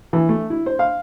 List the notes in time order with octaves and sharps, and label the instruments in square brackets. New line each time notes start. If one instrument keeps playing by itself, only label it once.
[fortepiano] E3
A3
E4
C5
F5